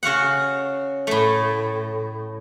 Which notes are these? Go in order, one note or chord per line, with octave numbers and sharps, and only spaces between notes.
C#3 F#4 F5 F#5
A2 A3